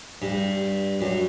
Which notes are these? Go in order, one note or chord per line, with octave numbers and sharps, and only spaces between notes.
G2
F#2